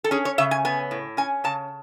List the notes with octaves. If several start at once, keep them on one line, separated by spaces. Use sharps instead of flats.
A4
C#4 G#4
C#5
C#3 E5
G#5
B3 G#5
A2
C#4 G#5
C#3 A5